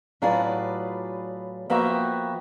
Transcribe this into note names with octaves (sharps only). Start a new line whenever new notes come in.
A2 F#3 F4 G#4 B4 D5
F3 A#3 B3 F#4 E5 G5